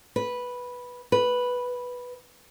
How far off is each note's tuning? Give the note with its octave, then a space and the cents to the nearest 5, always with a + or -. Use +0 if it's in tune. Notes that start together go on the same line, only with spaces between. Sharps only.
B4 -5
B4 -5